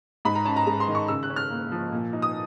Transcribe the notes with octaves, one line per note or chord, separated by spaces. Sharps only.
G#2 B5
A#5
C#4 A5
A#5
G#3 A#5
C6
D#3
C#6
C#3 E6
F#6
C#4
F6
A#3
F3
A#2
D#4
D#6